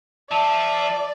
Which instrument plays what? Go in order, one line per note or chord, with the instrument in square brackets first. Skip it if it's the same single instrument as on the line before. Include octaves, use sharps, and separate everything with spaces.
[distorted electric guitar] F3 [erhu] D5 [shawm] E5 [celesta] A5